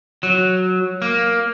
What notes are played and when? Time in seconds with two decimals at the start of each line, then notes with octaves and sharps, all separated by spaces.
0.23 F#3
1.02 A#3